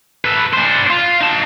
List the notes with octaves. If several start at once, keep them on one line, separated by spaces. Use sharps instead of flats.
A4 B4
D4 C5
F4
D#4 A5